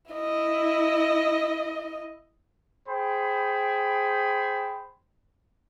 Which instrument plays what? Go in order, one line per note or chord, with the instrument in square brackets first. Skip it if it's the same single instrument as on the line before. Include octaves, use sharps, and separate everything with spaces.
[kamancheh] E4 D#5
[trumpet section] G#4 C5 G5 B5